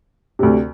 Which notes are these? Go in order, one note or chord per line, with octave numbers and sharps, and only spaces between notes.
D2 C3